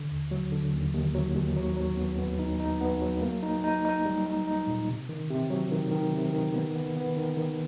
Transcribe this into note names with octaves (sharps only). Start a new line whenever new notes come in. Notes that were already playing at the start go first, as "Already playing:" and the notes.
Already playing: D3
D#2
F#3
D3
D#2
D#2
F#3
D#2
F#3
F#3
B3
B3
D#4
D#4
B3
F#3
A#3
D#4
D#4
D#4
G3
D#4
D#4
A#2
C3
D#3
C3
F#3
D#3
D#3
C3
D#3
B3
B3
B3
D#3
D#3